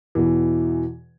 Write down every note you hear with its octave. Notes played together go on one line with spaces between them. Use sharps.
E2 B2 E3